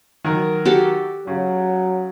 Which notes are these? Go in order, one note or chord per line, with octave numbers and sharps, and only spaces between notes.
D#3 F#3 A#4
F#4 G4 A4
C#3 F#3